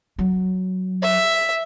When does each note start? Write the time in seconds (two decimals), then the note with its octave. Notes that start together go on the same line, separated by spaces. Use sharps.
0.19 F#3
1.02 E5